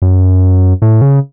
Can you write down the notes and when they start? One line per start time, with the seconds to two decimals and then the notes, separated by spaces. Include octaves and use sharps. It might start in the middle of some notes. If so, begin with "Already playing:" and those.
0.02 F#2
0.82 A2
1.02 C#3